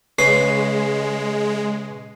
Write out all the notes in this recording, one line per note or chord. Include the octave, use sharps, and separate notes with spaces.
C#3 G#3 B4 C7